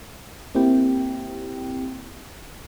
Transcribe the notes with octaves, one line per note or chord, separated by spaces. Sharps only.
A#3 C4 E4 G4 G5